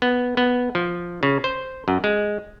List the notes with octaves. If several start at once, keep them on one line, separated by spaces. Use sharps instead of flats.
B3
B3
F3
C#3
C5
F#2
G#3